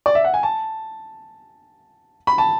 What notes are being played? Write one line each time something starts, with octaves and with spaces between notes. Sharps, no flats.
D5
E5
F#5
G#5
A5
B5
A5